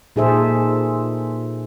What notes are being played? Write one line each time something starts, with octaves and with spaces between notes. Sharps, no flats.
A#2 D#4 G#4 A4 C5 E5